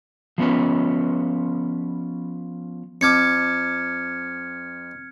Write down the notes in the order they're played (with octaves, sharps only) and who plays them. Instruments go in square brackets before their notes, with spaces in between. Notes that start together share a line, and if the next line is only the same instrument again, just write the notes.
[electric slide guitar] F3 B3 C#4 B4
[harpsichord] F2 A5 D6 [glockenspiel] F6 G#6 C#7